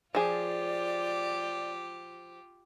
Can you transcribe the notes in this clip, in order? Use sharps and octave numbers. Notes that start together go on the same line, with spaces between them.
F3 F4 G4 G#4 D5